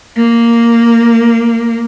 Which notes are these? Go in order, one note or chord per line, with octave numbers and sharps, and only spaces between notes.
A#3